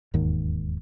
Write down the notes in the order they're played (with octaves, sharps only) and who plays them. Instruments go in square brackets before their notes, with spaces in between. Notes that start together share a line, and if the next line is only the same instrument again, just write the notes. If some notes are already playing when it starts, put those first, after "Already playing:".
[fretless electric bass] E1 D#2 G#2 D#3